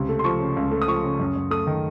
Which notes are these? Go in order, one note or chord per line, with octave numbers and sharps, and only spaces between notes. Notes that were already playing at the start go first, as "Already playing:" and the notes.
Already playing: C#2 C3
A3
C6
F3 C#6
C#3
C#2
A3
D#6
F3 C#6
C#3
F#2
F#2
A3 D#6
D#3